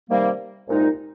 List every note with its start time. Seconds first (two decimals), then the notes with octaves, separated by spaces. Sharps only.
0.10 C3 D#3 G3 A#3
0.68 C2 A#2 G#3 D#4